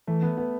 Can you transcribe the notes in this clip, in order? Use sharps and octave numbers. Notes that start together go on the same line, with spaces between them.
E3 A3
B3
B3